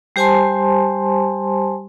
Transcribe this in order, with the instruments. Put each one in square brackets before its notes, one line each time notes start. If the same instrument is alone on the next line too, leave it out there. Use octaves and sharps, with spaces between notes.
[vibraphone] G3 G4 C5 G#5 A5 C6